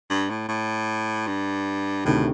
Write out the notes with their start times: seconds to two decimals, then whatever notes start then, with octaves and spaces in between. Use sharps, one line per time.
0.10 G2
0.29 A2
0.48 A2
1.27 G2
2.05 D2 A2 C3 D#3